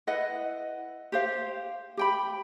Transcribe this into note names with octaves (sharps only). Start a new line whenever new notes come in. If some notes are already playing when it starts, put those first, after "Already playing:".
E4 B4 D#5 F#5
G4 C5 F5
G4 G5 B5